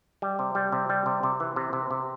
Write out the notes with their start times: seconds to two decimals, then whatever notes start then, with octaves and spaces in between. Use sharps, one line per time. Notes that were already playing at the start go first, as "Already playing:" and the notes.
0.22 G3
0.39 C3
0.55 G3
0.72 C3
0.90 G3
1.06 C3
1.23 C3
1.40 E3
1.56 C3
1.73 C3
1.91 C3